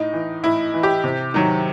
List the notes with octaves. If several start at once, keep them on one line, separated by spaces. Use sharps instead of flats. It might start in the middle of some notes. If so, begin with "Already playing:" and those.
Already playing: A2 D#4
E3
A2 E4
E3
G4
C3
D#3 F#3